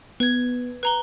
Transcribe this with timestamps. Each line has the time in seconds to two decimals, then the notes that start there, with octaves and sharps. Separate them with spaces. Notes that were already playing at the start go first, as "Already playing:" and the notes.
0.20 B3 B4 G#6
0.83 B4 A#5 G7